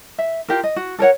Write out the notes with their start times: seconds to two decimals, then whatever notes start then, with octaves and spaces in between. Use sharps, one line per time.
0.18 E5
0.48 F4 G4 A#4
0.63 D#5
0.76 F#4
0.99 A4 A#4 C#5 F#5